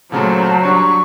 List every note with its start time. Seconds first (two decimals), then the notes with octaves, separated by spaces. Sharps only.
0.12 A#2 C#3 F#3 A3 C#4 C5 A5 A#5
0.63 G3 D4 C#5 C#6